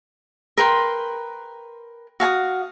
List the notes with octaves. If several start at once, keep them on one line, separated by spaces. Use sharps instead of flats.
A#4 B4 G5 C6
F#4 F5 G#5 D#6